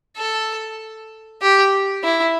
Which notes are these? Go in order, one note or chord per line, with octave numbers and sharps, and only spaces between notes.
A4
G4
E4